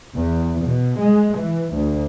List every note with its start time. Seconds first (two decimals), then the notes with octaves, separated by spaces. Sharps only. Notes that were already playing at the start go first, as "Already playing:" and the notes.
0.13 E2
0.65 B2
0.98 G#3
1.37 E3
1.73 D2